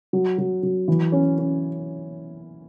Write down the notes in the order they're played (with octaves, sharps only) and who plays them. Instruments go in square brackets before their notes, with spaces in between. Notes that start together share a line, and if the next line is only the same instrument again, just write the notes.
[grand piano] F#3
F#3
F#3
E3
C#4
C#4